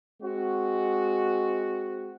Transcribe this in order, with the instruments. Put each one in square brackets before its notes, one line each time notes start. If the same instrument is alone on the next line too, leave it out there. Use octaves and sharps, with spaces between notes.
[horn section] G#3 C4 F#4